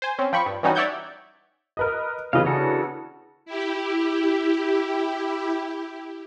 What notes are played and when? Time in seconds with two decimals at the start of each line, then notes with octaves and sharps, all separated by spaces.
0.02 C5 G#5
0.18 C4 C#4
0.33 F3 G5 B5 C#6
0.46 G2
0.63 E3 G3 C#4 D#4 F#4
0.75 C#5 D5 E5 F#5 G6 G#6
1.77 A#4 B4 D#5
2.33 C#3 E3 B3 B4 D#5 F5
2.46 D4 F#4 A4
3.46 E4 G4